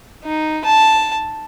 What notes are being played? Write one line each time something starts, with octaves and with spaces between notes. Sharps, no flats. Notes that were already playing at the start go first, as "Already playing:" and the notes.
D#4
A5